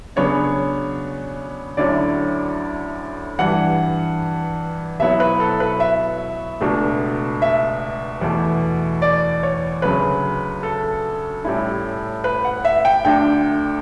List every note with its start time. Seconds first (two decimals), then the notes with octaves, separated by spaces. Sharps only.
0.16 C#3 F#3 B3 D4 C#5
1.77 D2 D3 F#3 C#4 E4 D5
3.38 G2 E3 G3 F#5
4.99 B2 F#3 B3 E4 E5
5.20 B4
5.40 A4
5.60 B4
5.80 E5
6.60 C#2 B2 A3 D4
7.42 E5
8.21 E2 B2 A3
9.02 D5
9.43 C#5
9.82 D2 C#3 F#3 B4
10.63 A4
11.44 A2 G3 C#4 E4
12.24 B4
12.45 F#5
12.65 E5
12.85 G5
13.05 D2 D3 A3 D4 G5